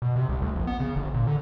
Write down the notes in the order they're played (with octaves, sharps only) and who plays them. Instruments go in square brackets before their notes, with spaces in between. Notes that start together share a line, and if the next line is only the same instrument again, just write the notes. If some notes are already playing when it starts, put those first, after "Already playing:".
[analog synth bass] B2
C3
C2
D2
A#1
B3
C#3
G1
A#2
D3